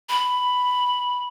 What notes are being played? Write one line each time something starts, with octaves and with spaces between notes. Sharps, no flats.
B5